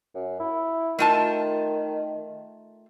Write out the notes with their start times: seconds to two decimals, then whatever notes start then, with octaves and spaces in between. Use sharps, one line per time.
0.14 F#2
0.40 E4
0.99 D#3 A3 F4 A5